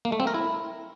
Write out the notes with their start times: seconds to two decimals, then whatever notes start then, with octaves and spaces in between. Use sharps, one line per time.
0.05 A#3
0.12 A3
0.20 C4
0.27 A#4
0.34 E4